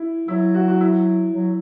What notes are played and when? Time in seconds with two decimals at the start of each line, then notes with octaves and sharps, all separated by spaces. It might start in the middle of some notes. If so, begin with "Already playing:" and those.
Already playing: E4
0.28 F#3 E4
0.54 F#4
0.68 F#4
0.81 E4
1.34 F#3